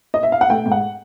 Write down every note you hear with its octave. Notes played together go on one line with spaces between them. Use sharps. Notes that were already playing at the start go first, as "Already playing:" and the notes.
D#5
E5
F5
F#5
A3 G5
G#2
F#5